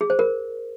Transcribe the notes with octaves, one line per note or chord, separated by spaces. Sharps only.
G#4
C5
A#4